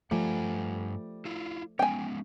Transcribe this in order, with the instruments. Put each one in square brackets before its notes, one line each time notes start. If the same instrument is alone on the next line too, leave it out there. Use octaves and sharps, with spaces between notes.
[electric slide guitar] G2 F#5 G#5 [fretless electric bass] F3 A3 [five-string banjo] G3
[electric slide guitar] E4 F4
[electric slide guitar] G#3 B3 C#4 [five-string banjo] G5 G#5